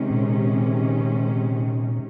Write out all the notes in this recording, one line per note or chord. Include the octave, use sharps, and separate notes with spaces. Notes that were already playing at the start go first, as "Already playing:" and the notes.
Already playing: C3 D#3 G#3 C#4
A#2